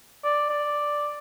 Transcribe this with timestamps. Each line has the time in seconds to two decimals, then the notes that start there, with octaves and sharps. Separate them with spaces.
0.24 D5
0.49 D5